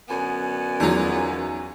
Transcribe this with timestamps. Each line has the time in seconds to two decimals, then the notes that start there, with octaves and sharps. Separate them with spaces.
0.08 F#2 D3 B3 G#5
0.80 E2 F#3 D#4 F4